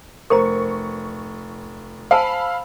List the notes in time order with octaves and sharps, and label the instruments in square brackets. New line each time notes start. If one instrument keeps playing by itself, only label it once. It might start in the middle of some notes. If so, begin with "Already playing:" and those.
[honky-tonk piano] F1 C#6 [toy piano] A#4 C5 A#5
[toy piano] C5 G#5 A5 [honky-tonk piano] F5 B5 E6